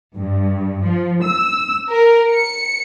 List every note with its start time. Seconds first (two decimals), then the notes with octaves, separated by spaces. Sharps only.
0.15 G2
0.82 F3
1.22 E6
1.90 A#4
2.33 C#7